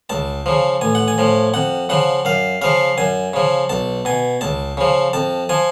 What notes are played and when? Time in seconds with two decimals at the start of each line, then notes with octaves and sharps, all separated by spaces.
0.09 C#2 A5
0.46 C#3 F3
0.81 A1 G#5
0.95 F#5
1.08 G#5
1.18 A2 F3
1.54 F2 F#5
1.89 C#3 F3 F#5
2.25 F#2 F5
2.62 C#3 F3 F5
2.98 F#2 G#5
3.33 C#3 F3
3.69 B1 A5
4.05 B2 G#5
4.41 C#2 A5
4.77 C#3 F3
5.13 F2 A5
5.49 F3 G#5